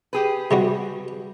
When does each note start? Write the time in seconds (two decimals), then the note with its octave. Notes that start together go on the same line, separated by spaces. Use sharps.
0.13 G4 G#4 B4
0.51 C3 G3 F#4